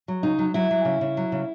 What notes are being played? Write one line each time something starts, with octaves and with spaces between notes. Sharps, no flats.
F#3
C#3 D#4
F#3
F#3 E4
F#3
C#3
C#3
F#3
C#3